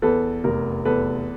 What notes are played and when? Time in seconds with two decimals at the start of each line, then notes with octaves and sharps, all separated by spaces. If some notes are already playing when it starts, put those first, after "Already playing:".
0.02 E2 A4 B4
0.44 F1 A#4
0.85 E2 A4 B4